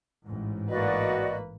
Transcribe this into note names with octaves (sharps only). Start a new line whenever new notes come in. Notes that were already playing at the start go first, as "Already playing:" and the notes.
A1 G#2
A#3 F#4 B4 D5 D#5